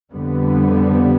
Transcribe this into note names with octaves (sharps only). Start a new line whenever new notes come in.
F2 D3 G3 B3